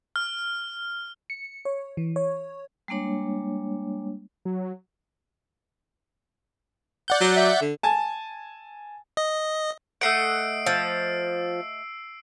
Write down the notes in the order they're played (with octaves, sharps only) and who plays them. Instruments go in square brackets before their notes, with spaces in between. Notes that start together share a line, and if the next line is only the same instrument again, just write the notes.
[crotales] F6
[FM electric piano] C#7
C#5
E3
C#5
[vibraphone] G3 G#3 A#3 D4 C#5
[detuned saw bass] F#3
[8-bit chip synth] D5 F#5 G6
[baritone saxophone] F#3
[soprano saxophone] E5
[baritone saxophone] D3
[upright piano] G#5 A5
[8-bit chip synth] D#5
[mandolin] A3 D#5 F#5 [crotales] E6 C7 D7
[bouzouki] F3 [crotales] E6